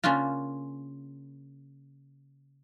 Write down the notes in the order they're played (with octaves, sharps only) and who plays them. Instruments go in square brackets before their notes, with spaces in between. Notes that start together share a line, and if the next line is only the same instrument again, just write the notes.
[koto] C#3 A#3 C#4 D4 F4